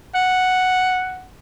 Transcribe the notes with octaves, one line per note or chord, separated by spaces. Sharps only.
F#5